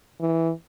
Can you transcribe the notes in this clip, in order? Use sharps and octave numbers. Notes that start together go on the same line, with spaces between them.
E3